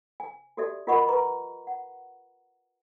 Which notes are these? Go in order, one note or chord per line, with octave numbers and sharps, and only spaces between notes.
G#5
F#4 G4 A4 D5 E5
F4 A#4 D#5 F#5 B5 C#6
B4 A#5 C#6
F#5